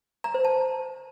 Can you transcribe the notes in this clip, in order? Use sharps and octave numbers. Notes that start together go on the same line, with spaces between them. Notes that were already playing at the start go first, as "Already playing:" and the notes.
A#5
C5
A5